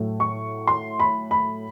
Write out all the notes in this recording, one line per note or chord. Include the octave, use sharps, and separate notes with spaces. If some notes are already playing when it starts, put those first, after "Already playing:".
Already playing: A2 F#3 A3
C#6
C6
B5
B5